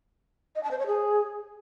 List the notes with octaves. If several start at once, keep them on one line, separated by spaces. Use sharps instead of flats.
D#5
A5
C5
C#5
G#4